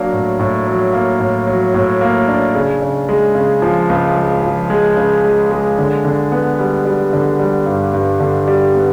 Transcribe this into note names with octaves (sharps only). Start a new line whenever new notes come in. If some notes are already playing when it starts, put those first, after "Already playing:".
Already playing: F#3 A#3 D4
A2
A2
F#3
A#3
A2
F#3
A2
A#3
D4
C#3
C#3
G#3
C#3
F3
C#2
G#3
F3
G#3
C#3
G#3
G#3
D3
D3
B3
G3
G3
D3
G3
G2
G2
D3
G3
B3